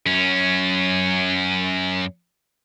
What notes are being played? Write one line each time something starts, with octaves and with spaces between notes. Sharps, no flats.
F#2 C#4